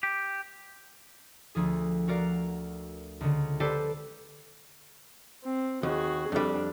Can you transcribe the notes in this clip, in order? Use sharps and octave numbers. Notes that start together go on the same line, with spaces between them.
G4
D2 F3 G#4
F#4 A#4 D5 F5
C#2 D3
G4 A4 B4 C5 D5 A5
C4
D#2 F#4 G#4
F2 G3 D4